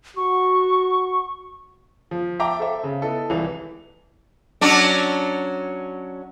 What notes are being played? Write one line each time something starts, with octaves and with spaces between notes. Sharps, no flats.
F#4 C#6
F3
E5 G5 A5 A#5 D6
A4 C5 E5
C#3
B3 E4 A4 D#5
C2 E3
F#3 C#4 D4